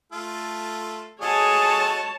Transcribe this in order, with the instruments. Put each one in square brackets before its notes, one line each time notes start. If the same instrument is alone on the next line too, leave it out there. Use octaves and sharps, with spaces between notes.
[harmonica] A3 F4 A4
[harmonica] F#4 A4 D#5 [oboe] G#4 [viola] C#5 A5